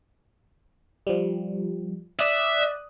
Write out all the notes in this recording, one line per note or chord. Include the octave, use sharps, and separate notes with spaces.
F3 G3
D5 E5 D#6 F#6